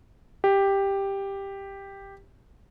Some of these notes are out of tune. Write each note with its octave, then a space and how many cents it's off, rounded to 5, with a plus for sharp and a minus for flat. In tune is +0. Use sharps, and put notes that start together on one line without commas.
G4 +5